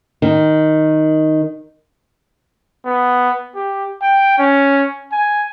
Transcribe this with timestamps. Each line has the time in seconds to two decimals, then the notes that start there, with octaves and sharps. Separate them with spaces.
0.22 D#3
2.86 B3
3.56 G4
4.02 G5
4.39 C#4
5.12 G#5